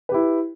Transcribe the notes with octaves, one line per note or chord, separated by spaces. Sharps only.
E4 G4 B4